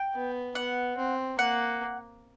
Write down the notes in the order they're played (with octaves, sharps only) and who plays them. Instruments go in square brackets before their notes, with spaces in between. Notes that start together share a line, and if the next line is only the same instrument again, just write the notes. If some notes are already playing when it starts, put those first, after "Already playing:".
Already playing: [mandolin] G5
[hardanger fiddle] B3
[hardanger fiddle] B3 [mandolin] F#5
[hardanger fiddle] C4
[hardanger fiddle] A#3 [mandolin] F#5